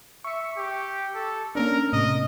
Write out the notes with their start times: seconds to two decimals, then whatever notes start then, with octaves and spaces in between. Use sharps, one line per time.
0.24 E5 C#6 C#7
0.57 G4
1.15 A4
1.55 A#3 C#4 D4 A#4
1.93 A2 C3 D#5